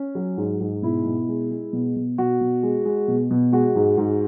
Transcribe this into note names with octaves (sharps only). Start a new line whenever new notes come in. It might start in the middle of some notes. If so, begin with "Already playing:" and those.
Already playing: C#4
F#3
G#2
G#2
B2 E4
B2
G#3
G#3
B2
B2
B2 F#4
B2
G#3
G#3
B2
B2
G#3 F#4
G#2
G#2